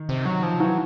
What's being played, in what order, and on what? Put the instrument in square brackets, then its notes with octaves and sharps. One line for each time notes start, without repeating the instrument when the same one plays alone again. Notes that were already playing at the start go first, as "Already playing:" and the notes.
Already playing: [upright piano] D#3
[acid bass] C3
F#3
F3
[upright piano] E3 [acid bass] F#3